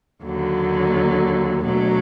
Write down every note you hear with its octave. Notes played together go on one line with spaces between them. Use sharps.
D#2 D3 F#3
B2 F#3 A3 D4